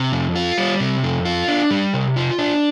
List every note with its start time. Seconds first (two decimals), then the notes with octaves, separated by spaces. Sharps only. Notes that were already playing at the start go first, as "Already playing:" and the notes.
Already playing: C3
0.12 F2
0.36 F4
0.58 G3
0.80 C3
1.03 F2
1.25 F4
1.48 D4
1.71 G3
1.94 C3
2.16 F4
2.38 D4